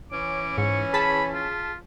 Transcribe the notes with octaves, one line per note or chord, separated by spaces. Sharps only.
E3 C#4 D6
G#2 C#6
G#4 A5 B5 B6
F4